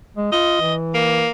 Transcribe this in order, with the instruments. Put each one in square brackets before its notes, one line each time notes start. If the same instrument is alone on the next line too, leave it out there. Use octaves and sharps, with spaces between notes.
[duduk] G#3
[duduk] F4 [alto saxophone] D#5
[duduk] E3
[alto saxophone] A#3